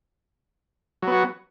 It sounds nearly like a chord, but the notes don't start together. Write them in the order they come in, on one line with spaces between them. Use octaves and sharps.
F#3 B3 F#4